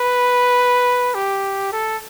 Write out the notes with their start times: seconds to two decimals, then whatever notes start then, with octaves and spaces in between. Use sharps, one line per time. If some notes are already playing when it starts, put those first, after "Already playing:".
Already playing: B4
1.14 G4
1.72 A4